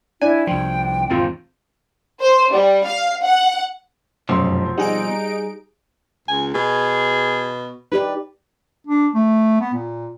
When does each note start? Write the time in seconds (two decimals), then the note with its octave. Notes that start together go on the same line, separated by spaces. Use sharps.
0.22 D4 E4 G#5
0.47 C2 F3 G5
1.10 E1 G#2 D#3 C4 F4
2.21 C5
2.53 G3
2.86 F5
3.24 F#5
4.29 F1 B1 F#2 B2 F3 C4 C6
4.78 G3 D#4 G#4 F#5 D7
6.28 C#2 G#5
6.54 B2 G#4
7.92 D#4 G4 B4 D5
8.87 D4
9.14 A3
9.60 B3
9.74 A#2